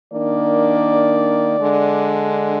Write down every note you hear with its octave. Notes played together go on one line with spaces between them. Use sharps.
D#3 A#3 D4 D5
D3 G#3 D4